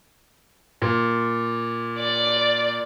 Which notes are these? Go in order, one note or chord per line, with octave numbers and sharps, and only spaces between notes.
A#2
D5